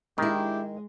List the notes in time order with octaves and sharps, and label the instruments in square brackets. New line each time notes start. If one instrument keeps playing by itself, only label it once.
[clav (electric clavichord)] D#3 [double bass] G#3 [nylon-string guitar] D4 E4 [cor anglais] G4